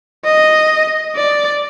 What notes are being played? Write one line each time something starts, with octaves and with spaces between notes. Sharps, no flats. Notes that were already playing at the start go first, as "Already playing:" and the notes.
D#5
D5